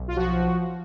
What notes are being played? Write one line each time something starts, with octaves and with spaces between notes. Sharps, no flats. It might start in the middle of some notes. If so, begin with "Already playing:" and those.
Already playing: B1
F4
F3 F#4